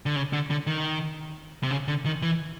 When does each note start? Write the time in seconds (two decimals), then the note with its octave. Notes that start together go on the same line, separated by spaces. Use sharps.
0.06 D3
0.16 C#3
0.33 D3
0.51 D3
0.67 D#3
1.63 C3
1.71 C#3
1.88 D3
2.06 D#3
2.22 E3